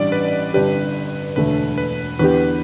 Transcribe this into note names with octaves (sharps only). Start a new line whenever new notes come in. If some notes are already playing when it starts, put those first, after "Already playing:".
Already playing: A1 G2 G3 D4 D5
B4
G1 G2 G3 D4 G4 B4
E1 D2 D3 A3 B4
B4
E2 D3 B3 G4 B4